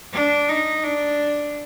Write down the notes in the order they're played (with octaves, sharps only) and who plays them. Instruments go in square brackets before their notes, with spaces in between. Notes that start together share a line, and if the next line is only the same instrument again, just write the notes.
[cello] D4
D#4
D4